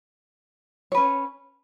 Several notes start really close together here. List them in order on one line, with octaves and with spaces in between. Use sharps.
C#5 B4 C#4